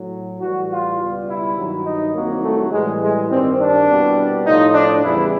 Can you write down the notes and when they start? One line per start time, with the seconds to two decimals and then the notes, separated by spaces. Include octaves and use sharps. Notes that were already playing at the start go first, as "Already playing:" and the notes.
Already playing: A2 F#3
0.41 A2 E3 G3 F#4
0.70 F4
0.98 C#2 B2 G3
1.28 E4
1.56 G2 D#3 F#3
1.85 D#4
2.14 C2 C3 D#3 F#3 A#3
2.43 A3
2.72 A2 E3 G3 G#3
3.02 G#3
3.30 G2 D#3 G3 C4
3.59 D4
3.88 C2 B2 G3
4.45 A2 F3 D#4
4.74 D4
5.03 E2 C#3 E3 G3 E4